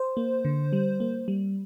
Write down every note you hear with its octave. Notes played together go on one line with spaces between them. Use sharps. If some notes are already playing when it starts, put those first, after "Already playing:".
Already playing: C5
A#3
D3
G3
A#3
G3